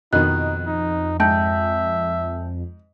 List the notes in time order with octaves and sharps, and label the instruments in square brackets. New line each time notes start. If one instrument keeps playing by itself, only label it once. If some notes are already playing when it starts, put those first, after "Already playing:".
[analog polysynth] F2 [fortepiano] B2 D#3 [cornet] D#4 [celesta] F#6
[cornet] D#4
[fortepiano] G#2 [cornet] E5 [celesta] G5 A5 G6